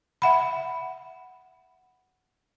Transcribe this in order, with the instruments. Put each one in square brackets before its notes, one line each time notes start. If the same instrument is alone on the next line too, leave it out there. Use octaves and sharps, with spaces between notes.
[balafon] E5 F#5 B5